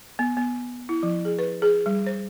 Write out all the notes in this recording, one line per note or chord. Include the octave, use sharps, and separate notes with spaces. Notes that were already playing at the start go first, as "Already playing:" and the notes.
B3
B3
E4
F3
G#4
B4
G#4
G3
C5